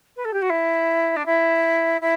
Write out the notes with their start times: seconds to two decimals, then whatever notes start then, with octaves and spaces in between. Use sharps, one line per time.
0.16 B4
0.24 A4
0.33 G4
0.41 F#4
0.49 E4
1.16 D4
1.25 E4
2.01 E4